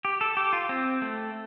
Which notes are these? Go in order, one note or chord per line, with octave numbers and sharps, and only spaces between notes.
G4
A4
G4
F4
C4
A3